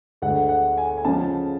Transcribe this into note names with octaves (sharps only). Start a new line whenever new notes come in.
D2 D3 G#3 F#5
F#5
G#5
G#5
C#3 F3 G#3 A5